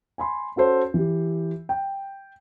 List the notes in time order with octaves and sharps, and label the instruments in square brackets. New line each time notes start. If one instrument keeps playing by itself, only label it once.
[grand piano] G#5 B5 C6
C#4 F#4 A4 C5 C#5
E3 G4
G5